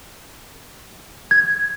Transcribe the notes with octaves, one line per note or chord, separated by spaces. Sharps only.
G#6